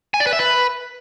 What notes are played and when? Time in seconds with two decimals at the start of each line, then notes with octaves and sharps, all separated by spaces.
0.14 G#5
0.20 D5
0.27 B4
0.33 E5
0.39 B4